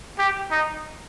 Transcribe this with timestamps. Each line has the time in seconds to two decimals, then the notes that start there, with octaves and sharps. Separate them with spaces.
0.19 G4
0.51 D#4